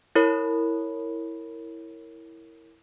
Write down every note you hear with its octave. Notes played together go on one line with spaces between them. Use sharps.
E4 A#4 C#5 B5